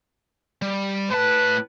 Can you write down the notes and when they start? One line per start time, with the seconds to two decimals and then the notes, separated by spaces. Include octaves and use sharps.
0.62 G3
1.10 A2 B4 A5